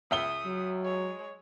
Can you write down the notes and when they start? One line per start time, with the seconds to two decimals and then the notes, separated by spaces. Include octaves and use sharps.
0.11 C#2 E5 D#6 G7
0.46 F#3
0.82 G#3 C#5